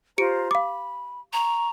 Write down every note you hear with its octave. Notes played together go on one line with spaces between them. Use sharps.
F4 G4 C5 A#5 C#7 D7
F5 B5 D6
A#5 C#6